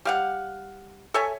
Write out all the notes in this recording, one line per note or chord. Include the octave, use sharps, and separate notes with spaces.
G3 F5 F#5
A4 C#5 E5 G#5